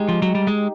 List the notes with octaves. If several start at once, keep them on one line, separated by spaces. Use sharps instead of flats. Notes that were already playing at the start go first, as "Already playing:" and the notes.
Already playing: G#3 D#4 G4 D#5
F3
F#3
G3
G#3